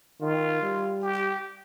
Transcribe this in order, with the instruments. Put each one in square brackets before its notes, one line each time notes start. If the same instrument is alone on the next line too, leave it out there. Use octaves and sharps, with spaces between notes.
[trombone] D#3 [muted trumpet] F4
[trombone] G3
[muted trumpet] G4